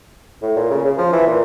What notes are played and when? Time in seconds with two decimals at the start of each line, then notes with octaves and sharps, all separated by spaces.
0.42 A2
0.56 A#2
0.70 C#3
0.85 C#3
0.98 F3
1.13 E3
1.26 A#2